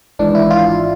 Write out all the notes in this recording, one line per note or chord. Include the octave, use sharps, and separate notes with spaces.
G#1 G#2 E3 D4
E4
F4